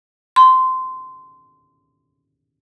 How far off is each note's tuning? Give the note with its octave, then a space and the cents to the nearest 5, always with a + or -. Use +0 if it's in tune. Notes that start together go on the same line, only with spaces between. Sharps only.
C6 -15